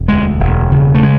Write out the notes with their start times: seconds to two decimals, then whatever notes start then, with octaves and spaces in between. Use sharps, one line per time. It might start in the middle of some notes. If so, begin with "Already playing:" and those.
Already playing: E1
0.08 D2 G#3
0.40 E1
0.72 C#3
0.94 A3
1.03 G#3